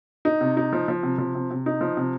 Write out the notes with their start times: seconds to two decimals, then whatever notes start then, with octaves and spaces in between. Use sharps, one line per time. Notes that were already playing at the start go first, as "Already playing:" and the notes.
0.25 D#4
0.41 C3
0.57 D#4
0.73 F3
0.88 F3
1.03 C3
1.18 F3
1.35 C3
1.50 C3
1.66 D#4
1.81 F3
1.97 C3